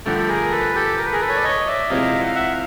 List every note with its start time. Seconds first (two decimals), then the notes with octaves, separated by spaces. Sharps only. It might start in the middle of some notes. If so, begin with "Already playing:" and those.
0.05 G2 D3 F3 A3 G4 A4
0.17 A4
0.28 G#4 A#4
0.52 A4 B4
0.75 G4 A4
0.98 A#4
1.05 B4
1.13 G#4 A#4
1.21 A4 B4
1.29 C#5
1.36 D5
1.44 C#5 D#5
1.67 D5 E5
1.90 C3 F3 G#3 C4 E4 D#5 F5
2.21 F#5
2.28 F5
2.35 E5 F#5
2.51 F5